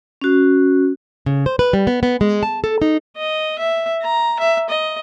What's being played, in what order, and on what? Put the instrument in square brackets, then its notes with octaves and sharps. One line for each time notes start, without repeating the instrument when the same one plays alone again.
[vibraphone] C#4 F#4
[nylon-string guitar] C#3
C5
B4
G3
B3
B3
G#3
A5
A4
D#4
[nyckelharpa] D#5
E5
A#5
E5
D#5